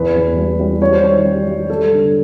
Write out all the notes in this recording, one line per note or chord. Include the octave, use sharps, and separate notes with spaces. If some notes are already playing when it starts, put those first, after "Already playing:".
Already playing: E2 B4
E2
G3
G3
G3 C#5
C5
D#3 C#5
G3
G3
G3 A4
D3